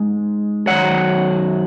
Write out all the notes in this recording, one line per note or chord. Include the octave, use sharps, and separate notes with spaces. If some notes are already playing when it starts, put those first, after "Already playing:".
Already playing: G#2 G#3
F#2 D#3 F#3 C#5 F#5